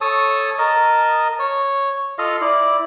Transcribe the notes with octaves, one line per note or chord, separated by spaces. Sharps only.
A4 C#5 A5 D#6
A#4 D#5 A5
C#5
F4 A4 D#5 F5
E4 D5